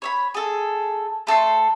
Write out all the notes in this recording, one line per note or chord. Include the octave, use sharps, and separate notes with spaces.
C#5 E5 B5
G#4 A4
A3 A4 A5 C6